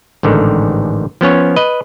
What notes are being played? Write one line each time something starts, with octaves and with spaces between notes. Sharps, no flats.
A1 G#2 D3 D#3
F3 B3 C#4 C#5
B4 D#5